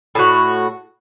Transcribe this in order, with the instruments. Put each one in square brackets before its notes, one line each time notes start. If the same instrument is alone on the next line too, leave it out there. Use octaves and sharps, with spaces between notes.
[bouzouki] A2 F#4